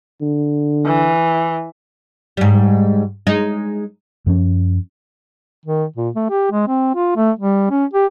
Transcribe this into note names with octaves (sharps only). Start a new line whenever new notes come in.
D3
E3
G#2 G3
G#3 D#4
F#2 F3 B3 C#4
D#3
A#2
A3
G4
G#3
C4
F4
A3
G3
C#4
G4